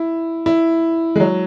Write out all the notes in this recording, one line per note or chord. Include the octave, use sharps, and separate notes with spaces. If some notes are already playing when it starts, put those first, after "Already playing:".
Already playing: E4
E4
G#3
F#3